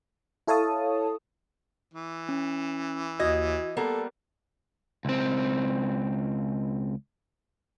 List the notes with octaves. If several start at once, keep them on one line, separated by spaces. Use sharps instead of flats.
E4 A4 C#5 F5 A5 D#6
E3
C#4
D#2 F#4 D#5 G#6
G3 A#3 B3 A4 A#4
C#2 C4